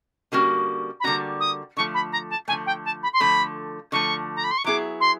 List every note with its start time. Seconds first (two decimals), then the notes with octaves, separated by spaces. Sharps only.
0.32 D3 G3 A#3 C#4 F#4
1.00 B5
1.04 D3 G3 A#3 C#4 F#4 A#5
1.40 D#6
1.77 D3 F3 A3 C#6
1.94 B5
2.12 A#5
2.30 A5
2.48 D3 F3 A3 G#5
2.66 G5
2.85 A5
3.03 B5
3.13 C6
3.20 D3 F3 A3 B5
3.92 D3 F3 A3 C#6
4.36 A#5
4.44 B5
4.51 C6
4.58 C#6
4.64 F#3 B3 E4 G#4 D6
5.00 C6